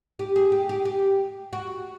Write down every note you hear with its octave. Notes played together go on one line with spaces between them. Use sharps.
G4
G#4
G4
G4
G4
F#4